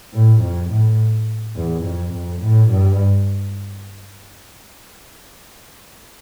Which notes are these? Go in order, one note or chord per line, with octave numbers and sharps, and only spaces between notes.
A2
F2
A2
E2
F2
F2
A2
G2